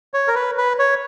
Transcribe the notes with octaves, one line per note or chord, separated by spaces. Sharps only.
C#5
A#4
B4
B4
C#5